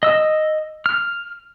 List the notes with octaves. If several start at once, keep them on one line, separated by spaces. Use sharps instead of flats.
D#5 E6
F6